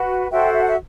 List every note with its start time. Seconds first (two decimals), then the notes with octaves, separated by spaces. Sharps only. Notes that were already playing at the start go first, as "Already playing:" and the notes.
Already playing: F#4 B4
0.31 F#4 A4 C5 E5 G5
0.54 E5
0.61 F#5
0.68 E5